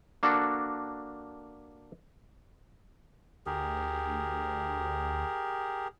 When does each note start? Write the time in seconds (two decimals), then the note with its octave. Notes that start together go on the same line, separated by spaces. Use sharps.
0.23 A#3 D4 F#4 A4
3.46 D2 G4 G#4 A#4